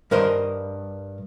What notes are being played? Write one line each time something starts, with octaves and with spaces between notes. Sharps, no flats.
G2 A#4 C5 D#5